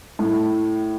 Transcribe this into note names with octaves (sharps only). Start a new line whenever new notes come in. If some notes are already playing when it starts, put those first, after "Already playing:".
A2